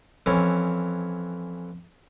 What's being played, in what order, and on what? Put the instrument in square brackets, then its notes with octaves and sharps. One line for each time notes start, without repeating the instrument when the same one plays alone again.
[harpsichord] F2 E3 C#4